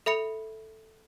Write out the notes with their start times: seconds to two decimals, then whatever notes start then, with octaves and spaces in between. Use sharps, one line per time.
0.06 A4 E5 B5 C#7